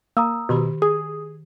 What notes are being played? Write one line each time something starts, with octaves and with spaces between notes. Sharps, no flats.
A#3 A#5 D#6 E6
B2 D#3 G4 B5
G#4 D#6